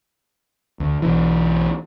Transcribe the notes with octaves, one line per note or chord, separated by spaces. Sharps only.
D2
B1 E3